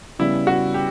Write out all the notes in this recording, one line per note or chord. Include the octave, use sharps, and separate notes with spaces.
C#3 G3 B3 E4
F#4
G4